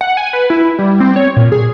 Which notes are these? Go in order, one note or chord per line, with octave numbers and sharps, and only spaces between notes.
F#5
G#5
B4
E4
G3
C4
C#5
A#2
G#4